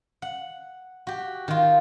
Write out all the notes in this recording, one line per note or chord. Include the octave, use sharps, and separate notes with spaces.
F#5
F#4 G4
D#3 F4